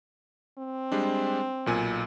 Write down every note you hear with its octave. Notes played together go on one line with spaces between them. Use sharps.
C4
G3 G#3 D4
B1 A#2 G#5